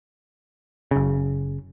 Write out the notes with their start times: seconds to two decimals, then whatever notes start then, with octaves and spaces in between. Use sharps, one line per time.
0.91 F#1 C#3